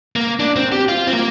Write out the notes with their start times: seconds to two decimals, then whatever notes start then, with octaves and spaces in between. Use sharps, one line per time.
0.16 A#3
0.40 D4
0.56 C4
0.72 G4
0.88 F4
1.07 C4
1.13 A#3